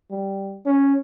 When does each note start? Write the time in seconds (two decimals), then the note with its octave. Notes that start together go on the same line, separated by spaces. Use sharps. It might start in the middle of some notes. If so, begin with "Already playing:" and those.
0.10 G3
0.65 C#4